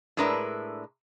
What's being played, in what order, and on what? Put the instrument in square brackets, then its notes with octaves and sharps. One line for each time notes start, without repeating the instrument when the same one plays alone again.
[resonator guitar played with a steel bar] A2 G#3 D4 A#4 B4 E5